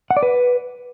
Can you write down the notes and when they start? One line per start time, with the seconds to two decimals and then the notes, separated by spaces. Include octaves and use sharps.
0.11 F#5
0.17 D5
0.23 B4